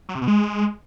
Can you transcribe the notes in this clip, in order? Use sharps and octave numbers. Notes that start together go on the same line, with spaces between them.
F#3
C3
B2
G#3